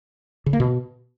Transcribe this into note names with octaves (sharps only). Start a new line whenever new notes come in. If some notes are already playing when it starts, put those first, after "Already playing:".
C#3
A#3
B2